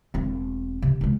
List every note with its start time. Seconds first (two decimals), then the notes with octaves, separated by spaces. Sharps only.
0.14 E1 C4
0.82 C3
1.01 G3 G#3